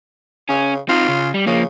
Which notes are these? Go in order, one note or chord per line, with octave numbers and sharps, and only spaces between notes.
C#3 C#4
C4 D#4 F4
C#3
G3
C#3 F3 A#3